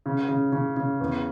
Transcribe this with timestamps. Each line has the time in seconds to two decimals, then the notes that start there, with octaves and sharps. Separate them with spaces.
0.06 C#3
0.29 C#3
0.52 C#3
0.77 C#3
1.01 E2